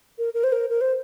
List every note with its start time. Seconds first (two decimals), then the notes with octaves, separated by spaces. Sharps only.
0.19 A#4
0.34 A#4
0.44 C5
0.52 A#4
0.70 A#4
0.81 C5